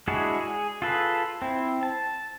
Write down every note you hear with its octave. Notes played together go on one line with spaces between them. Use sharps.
G#3 D4 E4 F#4 G#4
G#4
F4 G#4 A4 B4
C4 E4
A5